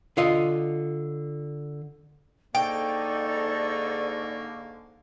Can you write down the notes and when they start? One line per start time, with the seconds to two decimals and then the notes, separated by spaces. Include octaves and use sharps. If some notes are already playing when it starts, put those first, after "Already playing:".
0.17 D3 F4 D#5
2.55 G#2 D3 A#3 D#4 A4 D5 G5 C#6